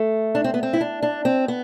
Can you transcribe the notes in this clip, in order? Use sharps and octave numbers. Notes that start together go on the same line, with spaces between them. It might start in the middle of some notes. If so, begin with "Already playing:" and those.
Already playing: A3
D4
C4
B3
C4
E4
D4
D4
C4
B3